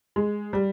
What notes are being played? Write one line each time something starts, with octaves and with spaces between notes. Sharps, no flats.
G#3
G3